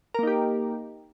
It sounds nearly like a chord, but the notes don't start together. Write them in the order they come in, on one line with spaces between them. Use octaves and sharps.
A#4 A#3 D#4 G4